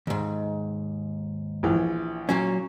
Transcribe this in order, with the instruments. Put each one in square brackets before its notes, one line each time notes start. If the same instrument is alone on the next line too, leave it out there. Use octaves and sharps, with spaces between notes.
[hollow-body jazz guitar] D#2 G#2
[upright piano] A#1 E3
[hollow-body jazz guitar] A#2 F#3 C#4